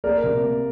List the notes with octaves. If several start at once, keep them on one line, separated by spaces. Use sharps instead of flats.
A#3 A#4 D5
C3
A#3